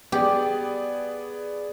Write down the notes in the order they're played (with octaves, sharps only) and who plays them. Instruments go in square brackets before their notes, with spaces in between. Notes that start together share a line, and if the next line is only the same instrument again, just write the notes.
[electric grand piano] B3 G#4 D5 [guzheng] G4